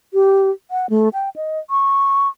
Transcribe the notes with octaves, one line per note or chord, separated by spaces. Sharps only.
G4
F#5
A3
G5
D#5
C#6